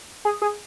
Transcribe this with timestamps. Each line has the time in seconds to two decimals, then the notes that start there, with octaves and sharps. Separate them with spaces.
0.25 G#4
0.42 G#4